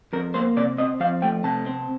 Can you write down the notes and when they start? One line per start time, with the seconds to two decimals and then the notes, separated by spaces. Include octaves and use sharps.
0.13 F2 A#4
0.34 A#3 C5
0.56 C3 D5
0.78 C4 D#5
1.00 F3 F5
1.22 A3 G5
1.44 C3 A5
1.66 C4